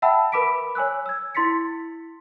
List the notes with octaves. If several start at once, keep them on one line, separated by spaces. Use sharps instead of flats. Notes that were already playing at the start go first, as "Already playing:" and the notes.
E5 F#5 G5 A5 B5 E6
A#4 B4 B5 D6 B6 D7
C#5 G#5 E6 F#6
E6 G#6
E4 C6 A6 B6 C#7